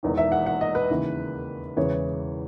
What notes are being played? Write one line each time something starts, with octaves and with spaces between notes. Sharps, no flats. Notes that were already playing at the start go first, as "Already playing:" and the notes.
E1 E2 D#3
E5
F#5
F#5
D#5
B4
D#2 C#3 E3
E1 E2 C#3 E3 C#5